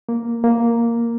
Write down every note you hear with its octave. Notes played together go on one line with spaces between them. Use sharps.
A#3
A#3